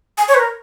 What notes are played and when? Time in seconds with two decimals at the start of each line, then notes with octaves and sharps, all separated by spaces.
0.18 G#5
0.28 C#5
0.35 B4
0.39 A#4